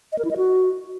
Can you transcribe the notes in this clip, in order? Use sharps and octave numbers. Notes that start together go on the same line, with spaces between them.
D#5
A#4
E4
D#5
F#4